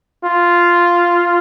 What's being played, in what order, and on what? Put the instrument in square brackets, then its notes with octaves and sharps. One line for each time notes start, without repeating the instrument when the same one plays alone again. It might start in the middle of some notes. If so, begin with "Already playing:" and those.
[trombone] F4